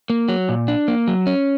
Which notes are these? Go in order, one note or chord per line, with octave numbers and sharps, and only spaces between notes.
A#3
F#3
A#2
D4
A#3
F#3
C#4